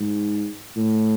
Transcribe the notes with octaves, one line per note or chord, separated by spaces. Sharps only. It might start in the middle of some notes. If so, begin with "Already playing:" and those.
Already playing: G#2
A2